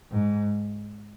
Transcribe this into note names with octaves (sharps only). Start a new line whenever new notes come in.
G#2